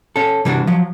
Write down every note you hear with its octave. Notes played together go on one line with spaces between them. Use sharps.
C#4 A4
C3 E3 G3 B3 D4 F#4
F3 F#3